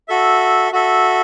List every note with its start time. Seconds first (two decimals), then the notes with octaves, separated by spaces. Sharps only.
0.08 F#4 A4 E5
0.72 F#4 A4 E5